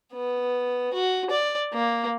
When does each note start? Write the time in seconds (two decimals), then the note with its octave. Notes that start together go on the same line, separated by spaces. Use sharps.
0.14 B3
0.94 F#4
1.30 D5
1.73 A#3